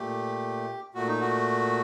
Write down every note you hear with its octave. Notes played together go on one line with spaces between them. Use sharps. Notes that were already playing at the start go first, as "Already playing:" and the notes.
Already playing: A#2 A3 G4
A#2 A3 F#4
D#4
F#4